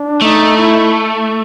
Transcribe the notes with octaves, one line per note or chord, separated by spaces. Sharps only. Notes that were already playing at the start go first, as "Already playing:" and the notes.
Already playing: D4
A3 D#4
E4